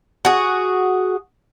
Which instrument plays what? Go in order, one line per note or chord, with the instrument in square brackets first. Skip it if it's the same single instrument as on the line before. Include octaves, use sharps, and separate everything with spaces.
[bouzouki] F#4 G#4